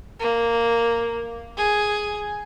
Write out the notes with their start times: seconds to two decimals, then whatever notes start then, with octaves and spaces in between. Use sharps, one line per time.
0.20 A#3
1.57 G#4